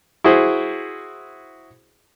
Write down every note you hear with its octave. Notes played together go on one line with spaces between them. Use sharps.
E4 F#4 G#4 C5